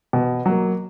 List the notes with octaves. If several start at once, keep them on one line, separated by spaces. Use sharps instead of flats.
B2
F#3 A#3